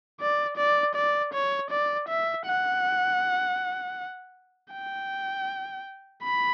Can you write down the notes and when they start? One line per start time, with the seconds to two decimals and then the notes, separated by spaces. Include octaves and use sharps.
0.20 D5
0.57 D5
0.95 D5
1.33 C#5
1.71 D5
2.09 E5
2.46 F#5
4.73 G5
6.24 B5